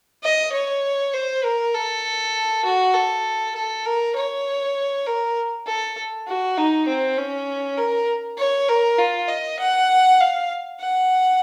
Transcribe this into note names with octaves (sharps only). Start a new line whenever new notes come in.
D#5
C#5
C5
A#4
A4
F#4
A4
A4
A#4
C#5
A#4
A4
F#4
D#4
C4
C#4
A#4
C#5
A#4
F4
D#5
F#5
F5
F#5